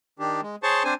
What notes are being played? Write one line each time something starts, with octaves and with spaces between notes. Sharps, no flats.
D#3 D4 G4
G#3
G#4 C5 C#5 A5 C6 C#6
C4 D4 C5 G#5